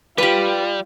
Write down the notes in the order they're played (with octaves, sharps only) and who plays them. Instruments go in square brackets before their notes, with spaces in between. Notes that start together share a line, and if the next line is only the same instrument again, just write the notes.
[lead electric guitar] G3 [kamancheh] F4 [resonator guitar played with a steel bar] G4 B4